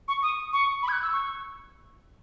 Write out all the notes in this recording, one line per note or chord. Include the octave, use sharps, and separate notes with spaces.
C#6
D#6
C#6
B5
G#6
F#6
E6
C#6